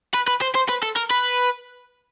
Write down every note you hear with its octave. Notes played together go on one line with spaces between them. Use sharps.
B4
B4
C5
C5
B4
A4
A#4
B4